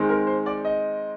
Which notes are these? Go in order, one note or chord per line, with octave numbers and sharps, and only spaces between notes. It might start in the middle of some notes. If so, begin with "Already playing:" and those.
Already playing: D#3 G#3 C4
A#4
C5
D5
D#5